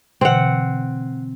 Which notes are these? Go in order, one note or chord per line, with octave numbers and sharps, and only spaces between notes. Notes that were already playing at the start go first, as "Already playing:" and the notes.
B2 D3 E3 C4 F#5